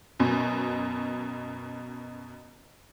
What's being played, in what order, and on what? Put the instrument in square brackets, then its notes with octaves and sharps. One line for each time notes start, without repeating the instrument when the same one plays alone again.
[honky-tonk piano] F#2 B2